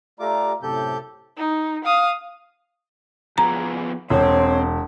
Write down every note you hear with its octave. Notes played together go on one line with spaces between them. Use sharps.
A3 F4 G4 D5 A#5 D6
F#2 A2 C3 G4 A4 G6
D#4
F5 D#6
F3 B3 G#4 A#5
E1 C4 C#5